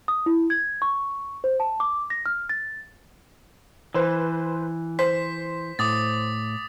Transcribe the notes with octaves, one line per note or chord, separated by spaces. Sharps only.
D#6
E4
G#6
C#6
C5
A5
D6
A#6
F6
A6
E3 B4 C5
C5 B6
A2 D6 D#6 A6